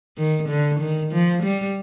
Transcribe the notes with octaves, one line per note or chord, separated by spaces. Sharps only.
D#3
D3
D#3
F3
G3